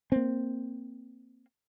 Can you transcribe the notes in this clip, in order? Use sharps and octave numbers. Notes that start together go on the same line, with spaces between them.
A#3 C4